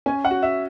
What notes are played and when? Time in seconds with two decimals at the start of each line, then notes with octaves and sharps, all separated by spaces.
0.06 C#4 G#5
0.25 F#5
0.31 F#4
0.42 E5